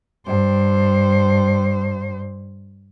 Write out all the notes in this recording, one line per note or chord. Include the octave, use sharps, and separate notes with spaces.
G2 C5